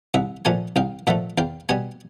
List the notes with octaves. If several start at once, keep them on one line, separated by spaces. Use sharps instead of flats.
C2 E5 F#5
A#2 F3 A3 F#5 G#5
C2 F5 G5
A#2 F3 A3 E5 F#5
E2 F5 G5
B2 G3 F#5 G#5